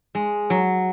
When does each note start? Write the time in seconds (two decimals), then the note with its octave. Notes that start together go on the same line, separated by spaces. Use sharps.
0.15 G#3
0.50 F#3